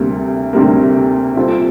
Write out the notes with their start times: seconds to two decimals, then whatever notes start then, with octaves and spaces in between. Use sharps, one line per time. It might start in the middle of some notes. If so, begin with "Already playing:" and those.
Already playing: D2 C3 G3 A#3
0.53 D2 C3 G3 A#3
1.37 C3 G3 C4 F4 A4